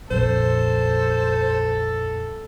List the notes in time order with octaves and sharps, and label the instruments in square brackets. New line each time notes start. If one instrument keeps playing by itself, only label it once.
[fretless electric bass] A#1 F2 [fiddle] A4 [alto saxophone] C5